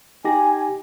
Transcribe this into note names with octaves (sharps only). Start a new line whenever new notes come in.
D#4 G4 G#5 A#6